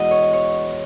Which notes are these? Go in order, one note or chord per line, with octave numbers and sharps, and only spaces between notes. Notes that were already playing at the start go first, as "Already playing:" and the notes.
Already playing: E2 B2 G#3 F#4 D#5
C#5
C#5